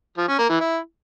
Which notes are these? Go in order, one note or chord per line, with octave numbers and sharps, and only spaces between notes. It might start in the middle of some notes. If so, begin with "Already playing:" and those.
F3
C#4
A#3
E3
E4